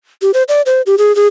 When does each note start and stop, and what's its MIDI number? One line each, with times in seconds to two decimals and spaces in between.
0.22 0.31 67
0.34 0.43 72
0.48 0.62 74
0.66 0.82 72
0.86 0.95 67
0.98 1.15 68
1.16 1.27 68